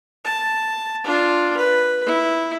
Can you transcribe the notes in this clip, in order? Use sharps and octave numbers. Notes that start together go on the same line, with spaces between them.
A5
D4 F4
B4
E4